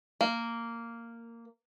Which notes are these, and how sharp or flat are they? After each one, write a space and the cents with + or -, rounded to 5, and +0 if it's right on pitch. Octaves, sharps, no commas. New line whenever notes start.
A#3 -10